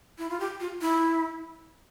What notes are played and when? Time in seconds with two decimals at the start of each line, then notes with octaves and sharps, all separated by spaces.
0.18 E4
0.30 F4
0.40 G4
0.60 F4
0.81 E4